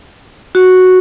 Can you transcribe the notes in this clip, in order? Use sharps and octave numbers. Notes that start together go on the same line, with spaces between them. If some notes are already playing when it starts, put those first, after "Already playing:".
F#4